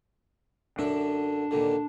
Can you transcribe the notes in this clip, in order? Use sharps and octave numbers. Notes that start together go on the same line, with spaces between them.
F#2 D3 D4 E5
D#2 A#2 D3